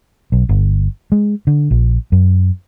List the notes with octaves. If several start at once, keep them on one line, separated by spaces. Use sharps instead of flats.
B1
G1
G#3
D3
A#1
F#2